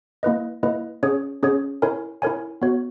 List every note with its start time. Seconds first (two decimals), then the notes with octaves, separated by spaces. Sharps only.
0.23 A#3 E4 B4 D#5
0.63 A#3 E4 B4 D#5
1.03 C#4 G#4 C#5
1.43 C#4 G#4 C#5
1.82 E4 A#4 C#5 G#5
2.22 E4 A#4 C#5 G#5
2.62 B3 F#4 C#5